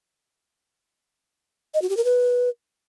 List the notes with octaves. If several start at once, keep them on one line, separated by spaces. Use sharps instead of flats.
D#5
F#4
G4
A#4
B4